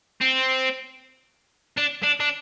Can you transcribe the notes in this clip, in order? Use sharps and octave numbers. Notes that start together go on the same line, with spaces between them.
C4
D4
D4
D4